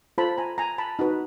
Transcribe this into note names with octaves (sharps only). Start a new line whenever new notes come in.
F4 A4 C5 A5 B5
G#5 A#5
G#5 A#5
A5 B5
D#4 F#4 B4